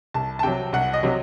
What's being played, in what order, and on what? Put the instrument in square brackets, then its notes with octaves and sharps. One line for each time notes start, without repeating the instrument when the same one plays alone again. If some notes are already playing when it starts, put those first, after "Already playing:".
[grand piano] C2 A5
A5
C3 F#3 G5
C2 F#5
D#5
C3 F#3